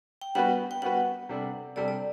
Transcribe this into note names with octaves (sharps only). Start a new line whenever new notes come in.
G5
G3 B3 F#4 B4 F#5
G5
G3 B3 F#4 B4 F#5
C3 G3 D4 A4
C3 G3 D4 A4 D5
D5